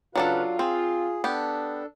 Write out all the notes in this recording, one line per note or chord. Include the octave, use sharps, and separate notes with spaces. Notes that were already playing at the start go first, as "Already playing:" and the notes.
C#3 F#3 D4 F4 A4 B4 F5
C4 G#4
B3 D4 G4 A4